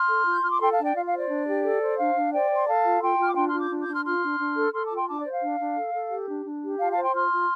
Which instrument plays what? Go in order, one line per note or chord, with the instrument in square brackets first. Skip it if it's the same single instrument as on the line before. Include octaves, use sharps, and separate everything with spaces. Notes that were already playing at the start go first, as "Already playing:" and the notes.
Already playing: [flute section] C6 F6
A4
F4 G6
F4 F6
D6
A4 G5 C6
F5 A5
D4
D5 G5
F4 F5
F5
C5
D5
D4
G4
A4
C5
D4 F5
D4
C5 D5 G5
C5
C6
A4 F5 A5
F4
F4 G5 C6
F4 F6
D6
D4 G5 C6
C6 F6
F4
D6 G6
D4
D6 G6
D4
C6 F6
F4 C6 F6
D4
D4
A4
A4 C6 F6
A5 D6
F4
G5 C6
D4 A5 D6
D5
C5
F5
D4
D4
A4
A4
G4
D4
D4
G4
F4 F5 A5
F5 A5
C5
G5 C6
F4 C6 F6
F4